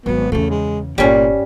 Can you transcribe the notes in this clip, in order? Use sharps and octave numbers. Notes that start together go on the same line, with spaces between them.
G#1 F#3 B3
E2 C#3 A3
G#3
G1 A#2 G3 C#4